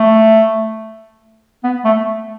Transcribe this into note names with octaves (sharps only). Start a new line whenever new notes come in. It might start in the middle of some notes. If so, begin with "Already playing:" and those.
Already playing: A3
B3
A3